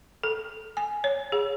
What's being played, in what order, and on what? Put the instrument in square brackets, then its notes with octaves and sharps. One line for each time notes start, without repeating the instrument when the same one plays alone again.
[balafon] A4
G#5
C#5
G#4